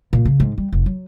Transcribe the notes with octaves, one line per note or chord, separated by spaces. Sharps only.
A#2
C#3
G#2
G3
F1
F#3